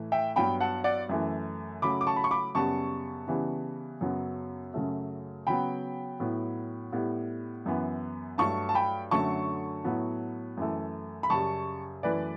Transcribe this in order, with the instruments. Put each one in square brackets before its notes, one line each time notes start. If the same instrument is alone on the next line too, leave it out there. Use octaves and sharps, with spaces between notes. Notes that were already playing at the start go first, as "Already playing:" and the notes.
Already playing: [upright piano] A2 E3 A3
E5 G5
G2 F#3 B3 G5 B5
F#5 A5
D5 F#5
F#2 E3 A3
C#3 F#3 A3 B5 D6
D6
A5 C#6
B5
C#6
B5 D6
F#2 C#3 G3 B3 A5 C#6
C#3 E3 G3 B3
F#2 C#3 F#3 B3
F#2 C#3 F#3 A3
C#3 F#3 B3 G5 B5
A2 F#3 B3
A2 G3 B3
F#2 E3 B3
G2 F#3 A3 A5 C#6
A5
G5 B5
F#2 D3 F#3 A3 A5 C#6
A2 F#3 B3
F#2 E3 A3
B5
F#2 C#3 G3 A5 C#6
F#2 E3 A3 B4 D5